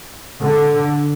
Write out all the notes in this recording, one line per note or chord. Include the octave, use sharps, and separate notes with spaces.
D3